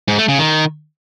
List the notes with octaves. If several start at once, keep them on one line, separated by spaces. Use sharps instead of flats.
G#2
A3
C#3
D#3